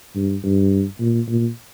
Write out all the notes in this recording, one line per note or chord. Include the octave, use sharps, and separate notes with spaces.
G2
G2
A#2
A#2